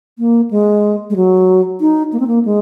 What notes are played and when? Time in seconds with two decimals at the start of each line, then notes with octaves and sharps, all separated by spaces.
0.19 A#3
0.51 G#3
1.10 G#3
1.16 F#3
1.80 D#4
2.13 A#3
2.20 C4
2.27 A#3
2.45 G#3